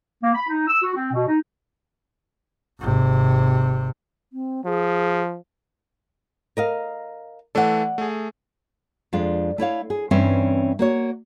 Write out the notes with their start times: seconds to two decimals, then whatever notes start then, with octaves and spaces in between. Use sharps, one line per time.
0.23 A#3
0.35 B5
0.48 D#4
0.68 E6
0.83 F#4
0.95 C4
1.13 B2
1.28 D#4
2.80 G#1 C3
4.33 C4
4.66 F3 G#4
6.57 A#4 D#5 F5
7.55 E3 A3 A4 D5 F#5
7.98 A3 G#4
9.13 F2 G#3 D4 F4
9.58 A3 E4 C#5 F5
9.90 G#4
10.11 G2 E3 C4 C#4 C#5 E5
10.79 A#3 F#4 C#5